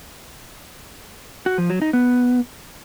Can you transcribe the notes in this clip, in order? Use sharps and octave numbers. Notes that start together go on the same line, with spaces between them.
F#4
F3
F#3
D#4
B3